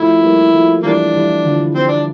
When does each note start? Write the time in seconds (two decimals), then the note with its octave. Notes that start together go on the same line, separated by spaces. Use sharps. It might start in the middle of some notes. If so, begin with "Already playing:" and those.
Already playing: F3 A3 E4
0.22 G3 A#3
0.53 F3 A3
0.83 E3 G3 A#3 D4
1.14 E3 G3
1.44 D3 F3
1.75 C4
1.88 D4